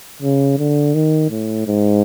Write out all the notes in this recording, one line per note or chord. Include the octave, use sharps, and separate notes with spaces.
C#3
D3
D#3
A2
G#2